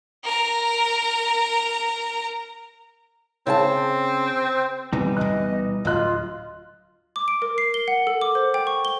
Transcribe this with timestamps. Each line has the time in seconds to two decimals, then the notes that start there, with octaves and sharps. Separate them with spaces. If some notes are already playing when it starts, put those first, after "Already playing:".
0.24 A#4 A#5
3.47 C#3 C4 E5 A5
4.93 B2 E3 G3 C4 D#4
5.17 D2 B2 D#5 F#6
5.85 D1 D2 F#3 F4 D#5 F#6
7.16 D6
7.28 D7
7.42 A#4
7.58 C7
7.74 G7
7.88 F#5
8.07 A4
8.21 D6
8.35 C5
8.54 G5
8.67 C#6
8.85 G7